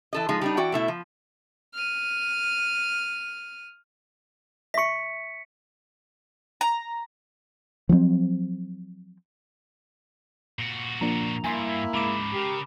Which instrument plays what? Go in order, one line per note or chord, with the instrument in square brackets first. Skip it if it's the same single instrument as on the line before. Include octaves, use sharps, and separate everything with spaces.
[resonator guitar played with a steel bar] E3 A4 D#5
F3 G#3 D#4
G3 D4 D#4
E3 F#4 D5 G5
B2 A3 E4
F3
[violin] F6 D#7
[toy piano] E5 C#6 [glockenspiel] B6 C#7
[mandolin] A#5
[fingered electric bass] F3 F#3 B3 C4
[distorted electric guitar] A#2 F#4
[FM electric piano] F3 A#3 D4 [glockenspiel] A#5 F7
[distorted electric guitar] G2 [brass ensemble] A#3 E4 [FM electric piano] G#5 C6
[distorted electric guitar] G#2 C#3 [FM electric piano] G#3 [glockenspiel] B5 D6 E7
[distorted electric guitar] C#3 [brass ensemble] G4 A#4